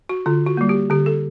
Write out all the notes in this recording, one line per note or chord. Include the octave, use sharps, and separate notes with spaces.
F#4
D3 F4
F#4
G3 A#3
G4
D3 G4
A4